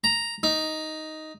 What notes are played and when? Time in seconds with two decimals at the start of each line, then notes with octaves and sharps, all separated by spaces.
0.04 A#5
0.43 D#4